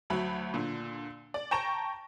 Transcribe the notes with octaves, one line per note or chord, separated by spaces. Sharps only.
D2 F#3 B5
A#2 D3
D5
G5 A5 A#5 C#6 A#6 E7